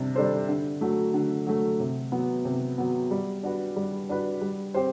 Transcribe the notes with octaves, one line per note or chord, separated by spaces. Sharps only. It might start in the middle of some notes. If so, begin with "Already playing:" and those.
Already playing: C3 G3 D4
G3 D4 A4 C5
D3
F#3 A3
D3
F#3 A3
C3
F#3 B3
C3
F#3 B3
G3
D4 F#4 B4
G3
D4 F#4 B4
G3
C4 G4 C5